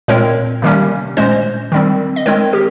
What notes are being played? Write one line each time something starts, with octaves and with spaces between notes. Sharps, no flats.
A#2 G#3 C4 A#4 C#5
C3 D#3 G3 A#3 C#4
A#2 G#3 C#4 C5 D#5
D#3 G3 C4
D#5
D#3 G#3 C4 A#4 C#5
G4 A#4